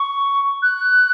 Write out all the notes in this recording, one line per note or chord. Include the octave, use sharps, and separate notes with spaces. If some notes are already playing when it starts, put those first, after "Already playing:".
Already playing: C#6
F#6